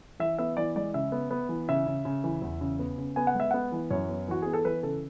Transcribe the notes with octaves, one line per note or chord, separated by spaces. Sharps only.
E3 E5
B3 E5
E3 D5
G#3 D5
C#3 E5
B3
B3
E3
C#3 E5
C#3
C#3
E3
E2
C#3
B3
C#3
B3 G#5
F#5
G#3 E5
B3 F#5
E3
F#2 C#5
B3
E3 F#4
B3 G#4
A4
E3 B4
C#3 A4